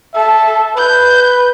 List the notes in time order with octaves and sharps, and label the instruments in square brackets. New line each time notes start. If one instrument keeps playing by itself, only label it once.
[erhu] A4 [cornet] E5
[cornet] B4 [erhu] G6